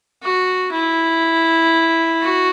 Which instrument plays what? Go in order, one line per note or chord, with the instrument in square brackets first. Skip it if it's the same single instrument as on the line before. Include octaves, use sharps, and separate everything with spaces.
[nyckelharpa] F#4
E4
F#4